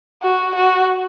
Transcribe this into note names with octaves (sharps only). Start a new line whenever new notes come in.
F#4
F#4